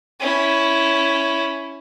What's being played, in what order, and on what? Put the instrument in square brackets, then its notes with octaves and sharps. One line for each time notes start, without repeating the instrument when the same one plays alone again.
[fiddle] C#4 E4